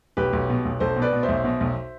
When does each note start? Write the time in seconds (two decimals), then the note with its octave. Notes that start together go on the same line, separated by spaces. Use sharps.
0.17 B1 G4 B4
0.33 B1
0.49 B2
0.65 B1
0.80 B1 A4 C5
0.96 B2
1.02 B4 D5
1.13 B2
1.23 C5 E5
1.28 B1
1.44 B2
1.60 B1